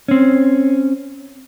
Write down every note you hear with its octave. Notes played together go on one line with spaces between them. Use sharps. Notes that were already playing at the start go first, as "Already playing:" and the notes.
C4 C#4